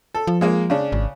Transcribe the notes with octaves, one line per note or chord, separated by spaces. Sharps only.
A4
F3
G#3 A#3 F4
C#3 D4
G#1